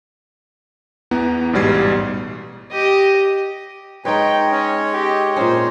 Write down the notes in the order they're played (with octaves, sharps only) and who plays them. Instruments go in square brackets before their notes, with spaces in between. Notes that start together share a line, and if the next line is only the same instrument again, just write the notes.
[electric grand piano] E2 E3 B3 A#5
A1 G#2 B2 G3 G#6 C7
[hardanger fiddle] G4 D#5
[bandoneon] G#3 C#5 D#5 [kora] D#4 B4 [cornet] G5
[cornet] C#4
G4
[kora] A#2 C#4 [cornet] C5